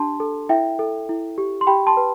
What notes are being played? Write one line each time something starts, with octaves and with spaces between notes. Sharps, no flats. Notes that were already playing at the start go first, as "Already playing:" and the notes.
Already playing: D4 G4 A5 C6
A4
E4 E5 G5
A4
E4
G4
C6
G4 G5 B5
A5 C6
B4